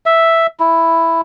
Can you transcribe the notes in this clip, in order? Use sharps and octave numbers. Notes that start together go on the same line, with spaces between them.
E5
E4